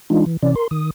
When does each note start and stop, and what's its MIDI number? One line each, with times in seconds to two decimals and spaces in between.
0.10 0.25 52
0.10 0.25 56
0.10 0.25 62
0.10 0.25 63
0.10 0.25 65
0.26 0.37 52
0.43 0.55 48
0.43 0.55 52
0.43 0.55 61
0.43 0.55 74
0.56 0.68 70
0.56 0.68 84
0.71 0.90 51
0.71 0.90 87